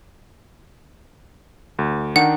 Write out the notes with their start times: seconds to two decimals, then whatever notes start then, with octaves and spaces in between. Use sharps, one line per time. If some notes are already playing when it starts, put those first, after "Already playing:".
1.79 D2
2.16 D#3 D4 D#4 F#5